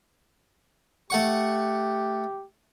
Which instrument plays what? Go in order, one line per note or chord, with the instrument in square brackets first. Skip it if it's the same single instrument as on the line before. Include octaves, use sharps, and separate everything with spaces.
[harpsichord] A3 F#5 C#6 [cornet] G4